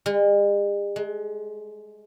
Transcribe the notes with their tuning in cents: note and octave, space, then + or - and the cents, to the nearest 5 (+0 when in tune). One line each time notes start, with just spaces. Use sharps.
G#3 -45
G#3 +30